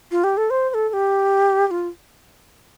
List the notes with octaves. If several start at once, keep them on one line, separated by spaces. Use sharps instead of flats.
F4
G4
A4
C5
C5
A4
A4
G4
G4
F4